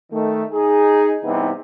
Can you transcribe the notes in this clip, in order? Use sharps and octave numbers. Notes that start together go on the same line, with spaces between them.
D#3 A3
D#4 G#4
C3 E3 G3 B3 D#4